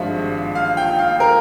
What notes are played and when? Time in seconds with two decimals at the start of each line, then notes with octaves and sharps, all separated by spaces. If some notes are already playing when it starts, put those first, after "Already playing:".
Already playing: G#1 G2 F3 G#3 E5
0.55 F5
0.77 G5
0.99 F5
1.20 A#4